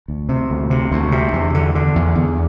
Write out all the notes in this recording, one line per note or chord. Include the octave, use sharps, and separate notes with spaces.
D2
C3
D2
C3
D2
C3
E2
D3
D3
E2
E2